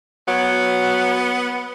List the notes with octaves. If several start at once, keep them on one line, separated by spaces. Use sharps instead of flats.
F#3 B3